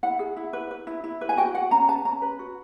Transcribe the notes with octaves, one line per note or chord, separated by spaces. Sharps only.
E4 F#5
G#4
E4
B4
B4
E4
E4
B4
G#5
F#4 G5
F#4 F#5
C#4 A#5
B4 A5
C#4 A#5
B4
F#4